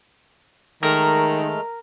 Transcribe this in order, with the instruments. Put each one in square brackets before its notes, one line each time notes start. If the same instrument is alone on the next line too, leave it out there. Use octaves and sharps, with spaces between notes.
[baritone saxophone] D#3 [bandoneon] G#3 A3 F6 [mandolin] A#4